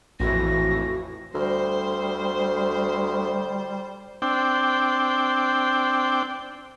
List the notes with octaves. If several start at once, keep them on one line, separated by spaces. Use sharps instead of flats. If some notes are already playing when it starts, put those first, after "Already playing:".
A#1 F2 A2 E3 F#4 A#6
D2 G3 C5
C4 D4 G5